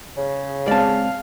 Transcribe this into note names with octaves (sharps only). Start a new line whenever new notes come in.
C#3
G#3 C4 D5 F5 A5